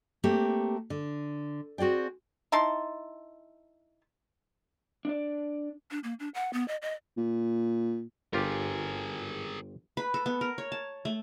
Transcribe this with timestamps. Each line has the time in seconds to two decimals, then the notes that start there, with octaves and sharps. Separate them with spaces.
0.24 A3 A#3 C4 G4
0.90 D3
1.78 C4 F#4 G#4 D5 G5
2.52 D#4 E4 A5 C6
5.05 D4 D5
5.91 D4
6.04 A#3
6.20 D4
6.34 F#5
6.53 B3
6.68 D#5
6.82 D#5
7.17 A#2
8.33 G1 F4 G4 G#4 A#4
9.97 B4
10.14 A4
10.26 B3
10.41 A#4
10.58 C#5
10.72 A5
11.05 A3